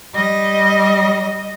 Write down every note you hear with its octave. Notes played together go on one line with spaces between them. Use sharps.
G3 D#5